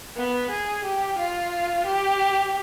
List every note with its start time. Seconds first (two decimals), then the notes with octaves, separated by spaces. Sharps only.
0.16 B3
0.50 G#4
0.84 G4
1.18 F4
1.86 G4